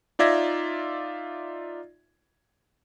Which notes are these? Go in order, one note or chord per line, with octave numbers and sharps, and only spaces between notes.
D#4 F4 D5 E5 G#6 A#6